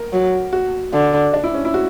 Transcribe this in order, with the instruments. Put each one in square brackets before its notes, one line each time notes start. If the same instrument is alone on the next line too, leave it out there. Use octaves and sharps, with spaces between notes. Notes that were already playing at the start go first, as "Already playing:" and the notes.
Already playing: [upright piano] A#4
[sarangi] F#3
[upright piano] F#4
[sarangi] D3
[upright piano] D4
E4
C#4
E4
F#4